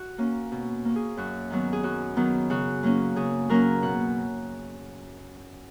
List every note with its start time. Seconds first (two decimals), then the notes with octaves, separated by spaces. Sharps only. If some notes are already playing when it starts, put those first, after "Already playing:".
Already playing: F#4
0.18 A#3 C#4
0.52 B2
0.85 A#3 C#4
0.96 G#4
1.17 F#2 F#4
1.50 D#3 F#3 B3
1.73 G#4
1.83 F#2 F#4
2.16 D#3 F#3 B3
2.50 C#3 F#4
2.83 F#3 A#3 C#4
3.16 C#3 G#4
3.49 F#3 A#3 C#4 A#4
3.82 B2 F#5